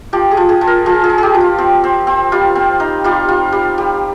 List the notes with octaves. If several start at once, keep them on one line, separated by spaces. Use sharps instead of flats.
F3 G4
G#4
F3
G#4
F3
A#4
F3 G#4
G#4
F3
G4 G#4
F3
F4
C4
C4
C4
G3 F4
C4
D#4
G3 F4
F4
G3
G3